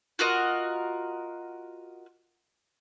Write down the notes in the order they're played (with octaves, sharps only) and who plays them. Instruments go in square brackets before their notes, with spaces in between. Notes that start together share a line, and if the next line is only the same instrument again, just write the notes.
[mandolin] F4 F#4 A#4 D#5